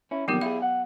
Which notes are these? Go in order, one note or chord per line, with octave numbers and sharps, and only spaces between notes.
C#4 E4
F2 A#2 D#3 F#3 B3 G4
E4 G#4 F5
F#5